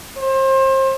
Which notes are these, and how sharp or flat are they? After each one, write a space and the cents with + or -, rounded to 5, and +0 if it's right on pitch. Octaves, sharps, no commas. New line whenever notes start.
C5 +30